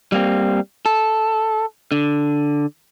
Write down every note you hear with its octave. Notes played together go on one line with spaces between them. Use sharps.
G3 A#3 C4
A4
D3